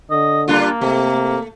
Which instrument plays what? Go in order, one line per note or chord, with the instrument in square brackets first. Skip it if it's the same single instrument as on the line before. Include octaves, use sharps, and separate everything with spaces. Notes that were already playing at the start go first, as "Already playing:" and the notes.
[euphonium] D3 [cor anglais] D#5
[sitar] G3 D4 F4 [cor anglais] A#3
[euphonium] C3 [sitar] A3